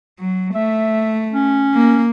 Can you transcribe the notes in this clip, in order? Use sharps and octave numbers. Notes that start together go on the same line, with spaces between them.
F#3
A3 E5
C#4
A#3